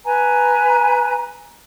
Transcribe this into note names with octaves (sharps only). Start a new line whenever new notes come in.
B4 G#5 A#5